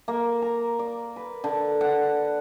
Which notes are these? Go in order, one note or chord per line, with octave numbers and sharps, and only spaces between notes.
A#3
A#5
D5
B4
D3
F#5